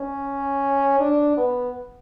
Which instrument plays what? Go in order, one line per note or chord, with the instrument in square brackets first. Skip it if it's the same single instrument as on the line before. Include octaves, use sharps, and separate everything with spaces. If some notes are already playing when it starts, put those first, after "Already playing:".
Already playing: [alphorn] C#4
D4
B3